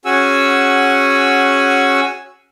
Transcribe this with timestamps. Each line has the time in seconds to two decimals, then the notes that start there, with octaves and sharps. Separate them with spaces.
0.05 C#4 F#4 G#4 F#5 G#5 E6